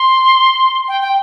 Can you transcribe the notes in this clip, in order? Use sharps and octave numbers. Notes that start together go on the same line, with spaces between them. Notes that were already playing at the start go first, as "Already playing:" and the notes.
Already playing: C6
G5
G5